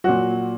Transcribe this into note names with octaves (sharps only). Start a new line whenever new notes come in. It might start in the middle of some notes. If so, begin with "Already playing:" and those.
A#2 F#3 F#4